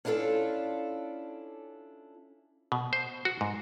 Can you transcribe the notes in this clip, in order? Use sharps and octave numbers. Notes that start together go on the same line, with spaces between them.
C#4 D4 E4 F4 A4
B2
C5
F#4
G#2